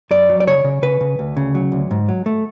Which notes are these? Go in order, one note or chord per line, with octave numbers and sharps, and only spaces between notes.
F#2 D5
F#3
D5
C#3 C#5
C#3
C#3 B4
C#3
D2
C#3
F#3
D2
G#2
F#3
A3